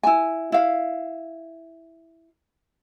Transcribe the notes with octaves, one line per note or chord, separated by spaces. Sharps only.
E4 G#5
E4 F5